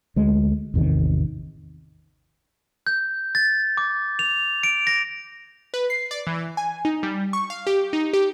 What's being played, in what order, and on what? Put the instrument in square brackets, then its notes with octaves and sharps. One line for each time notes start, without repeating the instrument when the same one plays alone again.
[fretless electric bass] D2 G#3
A1 E2 C3 D#3
[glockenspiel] G6
A6
D6
F7
D7
A#6
[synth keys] B4
C7
D5
E3
G#5
D#4
G3
C#6
F5
G4
D#4
G4